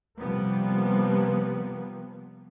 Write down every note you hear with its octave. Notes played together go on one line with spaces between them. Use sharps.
C3 F3 G3 A#3 B3